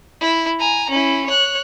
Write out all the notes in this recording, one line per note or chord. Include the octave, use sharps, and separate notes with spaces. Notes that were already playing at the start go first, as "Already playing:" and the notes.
E4
G#5 A#5
C#4 E4
C#5 F#6